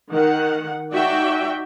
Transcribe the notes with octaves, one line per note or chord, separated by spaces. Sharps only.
D#3 F#5
D#4 F#4 D5 E5 G5